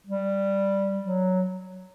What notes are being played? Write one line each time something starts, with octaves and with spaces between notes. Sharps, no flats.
G3
F#3